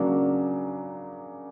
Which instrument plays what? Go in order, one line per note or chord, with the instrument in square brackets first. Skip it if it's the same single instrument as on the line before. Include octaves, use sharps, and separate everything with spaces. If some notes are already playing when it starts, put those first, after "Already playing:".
Already playing: [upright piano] C#3 F#3 A#3 D4